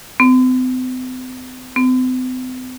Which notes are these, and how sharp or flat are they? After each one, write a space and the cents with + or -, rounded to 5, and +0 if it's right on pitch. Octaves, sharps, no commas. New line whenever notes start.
C4 -45
C4 -45